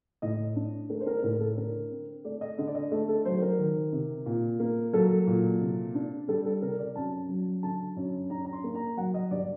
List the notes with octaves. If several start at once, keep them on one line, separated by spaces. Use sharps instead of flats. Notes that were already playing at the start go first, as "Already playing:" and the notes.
A2 D#5
D4
A3 A#4
C5
A#4
A2 A#4
A4
D3 A#4
C4
A3 D5
D#5
D3 D#5
D5
D#5
A3 D#5
A4
F#3 C5
A#4
D#3
C3
A#2
A#3
F#3 A4
A#2
C3
D4
G3 A4
A4
C3 A#4
D5
F#2 A5
F#3
D3 A5
F#2
D4 A#5
A#5
C6
A#3
A#5
F#3 F#5
D#5
G2 D5